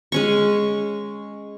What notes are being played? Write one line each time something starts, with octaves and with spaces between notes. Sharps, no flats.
G#3 C#4 C#6